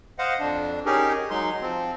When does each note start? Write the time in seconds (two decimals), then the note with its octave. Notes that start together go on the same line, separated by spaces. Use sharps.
0.19 C5 D#5 F5 F#5
0.40 F2 D4
0.86 C#4 D#4 G4 G#4 A#4
1.30 F#3 G#3 D#4 C6
1.62 F3 C4